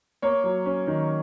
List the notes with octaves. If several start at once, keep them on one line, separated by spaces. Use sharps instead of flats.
A#3 C#5
F#3
C#4
D#3